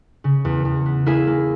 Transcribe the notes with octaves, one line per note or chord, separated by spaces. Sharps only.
C#3
E2
E2
B3
A#3 E4 G#4
A#3